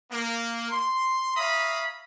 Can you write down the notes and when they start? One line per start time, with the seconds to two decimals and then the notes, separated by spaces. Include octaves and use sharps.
0.12 A#3
0.71 C6
1.36 C#5 E5 F5 A#5 B5 D#6